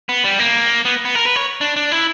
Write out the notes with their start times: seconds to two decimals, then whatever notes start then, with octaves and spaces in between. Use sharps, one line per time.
0.09 B3
0.24 G3
0.39 A#3
0.85 B3
1.05 B3
1.15 A#4
1.25 B4
1.36 C#5
1.61 D4
1.76 D4
1.92 E4